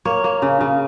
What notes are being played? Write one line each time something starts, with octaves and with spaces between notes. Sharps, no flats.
A#3 C#5
A#3
C#3
C#3